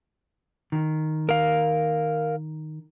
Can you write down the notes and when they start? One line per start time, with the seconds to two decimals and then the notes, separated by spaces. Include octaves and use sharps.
0.72 D#3
1.29 A#4 F5